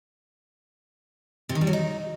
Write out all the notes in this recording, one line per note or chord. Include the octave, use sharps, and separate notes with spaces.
C3
D#3
G3
F#3
D#4